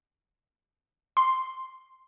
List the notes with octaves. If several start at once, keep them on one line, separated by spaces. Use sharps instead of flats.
C6